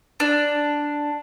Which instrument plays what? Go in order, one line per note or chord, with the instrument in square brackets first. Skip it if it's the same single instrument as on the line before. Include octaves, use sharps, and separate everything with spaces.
[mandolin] D4